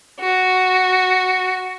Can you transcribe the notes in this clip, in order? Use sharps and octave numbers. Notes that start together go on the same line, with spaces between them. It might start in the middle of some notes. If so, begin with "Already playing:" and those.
F#4